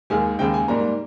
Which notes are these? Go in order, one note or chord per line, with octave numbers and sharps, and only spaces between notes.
D#2 D#3 G#3 G#5
D#2 C#3 G#3 G5
G#5
G#2 G3 A#3 A#5